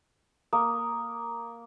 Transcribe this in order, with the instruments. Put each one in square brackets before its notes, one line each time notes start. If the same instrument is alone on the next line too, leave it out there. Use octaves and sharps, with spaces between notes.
[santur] A#3 [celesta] D#6